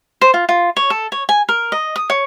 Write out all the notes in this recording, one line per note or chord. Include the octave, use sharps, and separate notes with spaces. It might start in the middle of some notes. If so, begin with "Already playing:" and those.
C5
F4
F4
C#5
A4
C#5
G#5
A#4
D#5
D#6
C#5